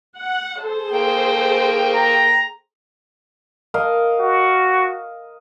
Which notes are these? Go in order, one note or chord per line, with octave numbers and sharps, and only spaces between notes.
F#5
G#4 A4 C5
A#3 G5
A#5
A#4 D#5 F5
F#4